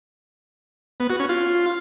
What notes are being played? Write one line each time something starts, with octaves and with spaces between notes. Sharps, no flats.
B3
F#4
C#4
F4